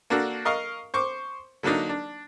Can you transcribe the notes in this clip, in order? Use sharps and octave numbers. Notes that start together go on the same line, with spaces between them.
A#3 D4 F#4 A4
A#4 D#5 F5 C#6
C5 C#6 D6
D3 F#3 A#3 D4 D#4
D4